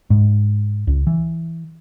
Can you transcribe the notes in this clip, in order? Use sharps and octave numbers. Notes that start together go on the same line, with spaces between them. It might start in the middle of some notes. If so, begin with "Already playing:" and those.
G#2
C#2
E3